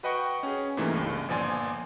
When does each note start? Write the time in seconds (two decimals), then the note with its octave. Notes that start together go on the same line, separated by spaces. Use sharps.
0.03 F#4 B4 D#5 F#5 G5 C#6
0.43 C#4 G#4
0.77 G#2 C3 E3 A3 A#3
0.92 C#2 G2
1.28 G1 A#2 F3 D5 G#5 C6